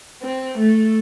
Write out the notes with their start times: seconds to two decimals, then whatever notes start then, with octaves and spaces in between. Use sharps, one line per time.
0.23 C4
0.58 A3